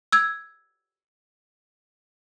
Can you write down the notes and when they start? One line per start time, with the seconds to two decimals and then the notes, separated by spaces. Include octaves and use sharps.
0.12 E6 G#6